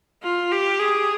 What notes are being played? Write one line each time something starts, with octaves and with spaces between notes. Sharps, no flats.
F4
G4
G#4